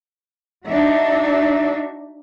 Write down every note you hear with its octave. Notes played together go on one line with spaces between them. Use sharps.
D4 D#4 F#4 E5